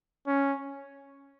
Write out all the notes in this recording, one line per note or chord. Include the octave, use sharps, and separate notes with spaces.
C#4